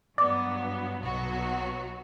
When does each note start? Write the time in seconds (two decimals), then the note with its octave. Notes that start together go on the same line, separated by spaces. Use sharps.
0.18 G2 F#3 B3 D5
1.02 B1 B2 F#3 B3 F#4